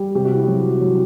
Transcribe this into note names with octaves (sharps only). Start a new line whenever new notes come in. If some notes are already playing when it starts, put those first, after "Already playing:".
Already playing: G3
C3 G4
F#4
E4
F#4
F#3
F#3